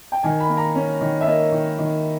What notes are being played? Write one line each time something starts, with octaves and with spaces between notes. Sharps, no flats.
G5
D#3 G#5
B5
A#3
A#5
C#4
D#3
E5
A#3 D#5
D#3
D#3